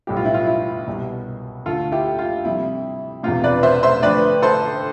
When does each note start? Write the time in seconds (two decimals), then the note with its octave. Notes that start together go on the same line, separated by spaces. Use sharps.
0.07 B1 A2 G3 B3 G4
0.17 F4
0.25 E4
0.34 F4
0.47 E4
0.87 C2 B2 G3
1.66 D2 D3 A3 F4 A4
1.92 E4 G4
2.19 F4
2.45 F2 C3 G3 E4
3.23 E1 E2 C3 F4
3.44 B4 D5
3.63 C5 E5
3.83 C5 E5
4.03 F2 D3 A3 B4 D5
4.42 A4 C5